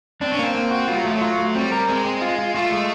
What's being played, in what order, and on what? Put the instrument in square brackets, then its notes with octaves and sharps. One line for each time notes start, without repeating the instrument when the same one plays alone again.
[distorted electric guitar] C4 [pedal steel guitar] D4
[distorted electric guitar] C#4
[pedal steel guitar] A#3 [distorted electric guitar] C4
[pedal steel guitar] A#3
F#4
[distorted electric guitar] G3 [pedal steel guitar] F4
[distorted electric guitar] F#3
[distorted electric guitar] F3 [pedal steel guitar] A3
[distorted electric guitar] F#3
[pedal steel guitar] F4
A3
[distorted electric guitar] G3 [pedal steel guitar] C4
[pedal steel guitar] A#4
[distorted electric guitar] G#3 [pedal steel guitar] C4
[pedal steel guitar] C4
F4
F4
[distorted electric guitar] A3 [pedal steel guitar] F4
[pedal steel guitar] G#3